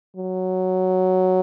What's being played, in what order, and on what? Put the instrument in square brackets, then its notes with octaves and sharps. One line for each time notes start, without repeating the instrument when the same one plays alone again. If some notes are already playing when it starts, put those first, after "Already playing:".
[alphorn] F#3